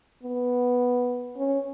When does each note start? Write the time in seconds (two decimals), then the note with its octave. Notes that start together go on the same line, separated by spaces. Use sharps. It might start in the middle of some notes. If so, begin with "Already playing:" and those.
0.23 B3
1.37 C#4